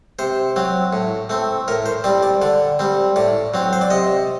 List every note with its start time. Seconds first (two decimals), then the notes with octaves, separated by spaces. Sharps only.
0.19 C3 C5
0.56 F#3 C4
0.93 A2
1.30 A3 C4
1.68 A2 A#4
1.86 C5
2.04 G3 C4 D5
2.23 D5
2.42 D3 D5
2.79 G3 C4
3.16 A2 D5
3.54 F#3 C4
3.73 C5
3.81 D5
3.90 C3 D#5